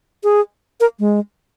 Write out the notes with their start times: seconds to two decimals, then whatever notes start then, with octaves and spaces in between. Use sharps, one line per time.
0.24 G#4
0.80 A#4
0.99 G#3